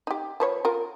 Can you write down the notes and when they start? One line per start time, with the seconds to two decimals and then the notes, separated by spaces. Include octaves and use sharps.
0.07 D#4 G4
0.40 F3 B4 C#5
0.65 F4 A#4